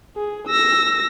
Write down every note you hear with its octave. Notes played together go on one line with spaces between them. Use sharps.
G#4
E6 A#6